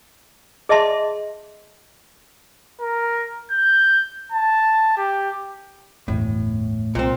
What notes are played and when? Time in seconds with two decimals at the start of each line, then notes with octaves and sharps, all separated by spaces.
0.69 G#4 D#5 E5 A5 C6
2.81 A#4
3.51 G6
4.32 A5
4.98 G4
6.08 G1 E2 A2
6.95 C2 A#2 C4